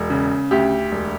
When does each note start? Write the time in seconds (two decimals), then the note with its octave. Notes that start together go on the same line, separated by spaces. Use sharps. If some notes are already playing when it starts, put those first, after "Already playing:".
Already playing: E1
0.10 C#3
0.51 D2 G4
0.92 E1